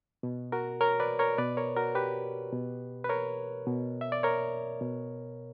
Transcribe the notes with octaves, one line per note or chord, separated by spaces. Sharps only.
B2
F#4 A#4
A#4 C#5
B4 D5
A#4 C#5
B2 B4 D5
A#4 C#5
F#4 A#4
G4 B4
B2
B4
A#4 C#5
B2
E5
D5
A#4 C#5
B2